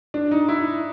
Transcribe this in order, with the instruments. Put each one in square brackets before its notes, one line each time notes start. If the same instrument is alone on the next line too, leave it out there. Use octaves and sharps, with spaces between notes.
[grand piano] D4
D#4
E4